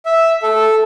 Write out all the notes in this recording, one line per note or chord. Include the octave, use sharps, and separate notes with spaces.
E5
A4